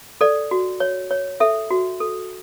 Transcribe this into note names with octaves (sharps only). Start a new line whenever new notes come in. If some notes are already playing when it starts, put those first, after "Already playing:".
A4 D5
F#4
C#5
C#5
A4 E5
F#4
A4